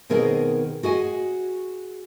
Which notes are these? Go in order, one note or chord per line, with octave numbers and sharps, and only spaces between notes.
B2 D#3 C4 G#4 A#4 D#5
F#4 G#4 D#5 G#5